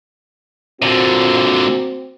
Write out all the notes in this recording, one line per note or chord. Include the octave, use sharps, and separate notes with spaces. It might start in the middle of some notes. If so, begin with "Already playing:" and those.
A#2 D3 C4 F#4